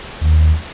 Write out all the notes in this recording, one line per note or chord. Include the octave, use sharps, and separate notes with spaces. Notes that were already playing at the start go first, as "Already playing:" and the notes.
D#2